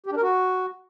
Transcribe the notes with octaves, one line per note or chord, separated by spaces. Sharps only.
G4
D4
A#4
F#4